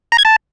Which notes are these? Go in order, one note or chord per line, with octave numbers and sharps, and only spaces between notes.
A#5
G#6
A5